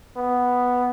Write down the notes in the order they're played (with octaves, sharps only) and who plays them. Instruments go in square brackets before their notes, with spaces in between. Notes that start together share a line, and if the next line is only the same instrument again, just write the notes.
[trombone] B3